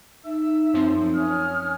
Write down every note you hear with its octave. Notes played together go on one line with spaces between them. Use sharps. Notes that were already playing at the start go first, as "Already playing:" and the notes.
D#4 E5 E6
F#2 F3 C4
C#4 D#6 F6